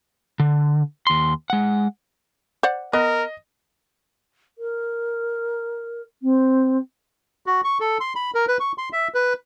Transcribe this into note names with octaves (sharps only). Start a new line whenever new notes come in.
D3
D#2 C6
G#3 F#5
C5 D5 F#5
B3 A#4 D#5
A#4
C4
F#4
C#6
A4
C6
B5
A#4
B4
C#6
C6
E5
B4